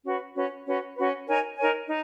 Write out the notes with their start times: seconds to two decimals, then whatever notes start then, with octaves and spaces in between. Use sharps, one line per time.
0.04 C#4 F#4 B4
0.34 C#4 F#4 B4
0.65 C#4 F#4 B4
0.96 C#4 F#4 B4
1.27 D#4 A#4 C#5 G#5
1.57 D#4 A#4 C#5 G#5
1.88 D#4